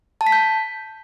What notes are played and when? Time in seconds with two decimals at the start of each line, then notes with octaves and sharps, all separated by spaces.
0.21 A5
0.27 B6
0.32 G6